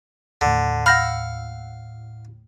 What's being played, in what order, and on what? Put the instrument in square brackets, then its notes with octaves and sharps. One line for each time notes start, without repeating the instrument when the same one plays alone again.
[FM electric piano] D#2 A2 [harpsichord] D3
[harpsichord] F5 [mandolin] F#5 E6 F6 [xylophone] B5 G6 A#6